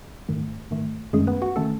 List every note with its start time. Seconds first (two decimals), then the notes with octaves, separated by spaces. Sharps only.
0.29 G#2 D#3 A3
0.71 G#2 D#3 A3
1.13 F#2 D#3 G#3 A3 C#4 G#4
1.27 B3 B4
1.42 F#4 F#5
1.56 D#3 A3 C#4 A4 A5